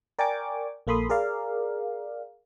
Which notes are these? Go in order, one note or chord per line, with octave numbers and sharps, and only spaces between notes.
A#4 D5 G5 G#5 C#6 D6
A#1 A#3 A4 B5 C6 D#6
G#4 A#4 D5 F5